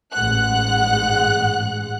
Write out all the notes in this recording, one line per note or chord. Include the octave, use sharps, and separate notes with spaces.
A1 G#2 G#3 F#5 F#6